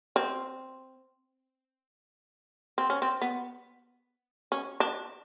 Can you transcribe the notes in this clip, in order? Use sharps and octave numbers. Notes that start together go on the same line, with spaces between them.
C4
C4
C#4
C4
B3
C#4
D4